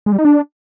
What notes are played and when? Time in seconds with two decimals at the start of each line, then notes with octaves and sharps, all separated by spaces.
0.06 G#3
0.12 G3
0.19 D#4
0.25 D4